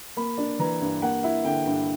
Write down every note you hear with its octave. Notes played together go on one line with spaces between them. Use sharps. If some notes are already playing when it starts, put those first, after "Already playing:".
A#3 B5
D4
E3 A#5
G2
A#3 F#5
E4
D3 G5
G2